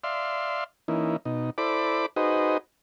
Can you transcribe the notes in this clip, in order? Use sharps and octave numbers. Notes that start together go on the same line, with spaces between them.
D5 E5 F5 C6
E3 A#3 C#4 D#4 E4
B2 D#4
E4 A4 C5 D5 B5 D6
D#4 F#4 G#4 B4 C5 D#5